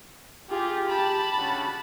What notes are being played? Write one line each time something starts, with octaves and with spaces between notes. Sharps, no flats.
F4 G4 G#4
A5 B5
C#3 D4 F#4